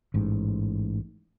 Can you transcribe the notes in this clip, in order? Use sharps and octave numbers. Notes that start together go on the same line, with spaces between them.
A1 G#2